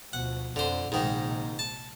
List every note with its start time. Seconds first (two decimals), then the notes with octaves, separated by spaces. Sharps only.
0.13 D2 B2 F3 F#5
0.56 F2 D3 C5
0.92 A#1 G#2 C3 D#3 G#3
1.59 A5